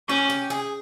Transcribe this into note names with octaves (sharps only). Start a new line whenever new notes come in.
C#4 G4
G4
G#4